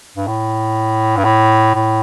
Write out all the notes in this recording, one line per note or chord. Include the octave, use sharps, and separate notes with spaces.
G2
A2
G2
A2
A2